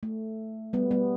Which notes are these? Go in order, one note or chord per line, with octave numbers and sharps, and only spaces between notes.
A3
G3 B3
G3 B3